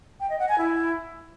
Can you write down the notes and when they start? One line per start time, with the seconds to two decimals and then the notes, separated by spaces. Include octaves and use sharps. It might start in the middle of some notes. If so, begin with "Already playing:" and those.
0.20 G5
0.30 D#5
0.39 F#5
0.49 G#5
0.58 E4